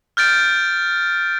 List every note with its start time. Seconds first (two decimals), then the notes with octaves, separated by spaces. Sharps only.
0.17 F6 G6 A6 D7